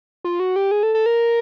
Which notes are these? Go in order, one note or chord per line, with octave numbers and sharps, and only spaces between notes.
F4
F#4
G4
G#4
A4
A4
A#4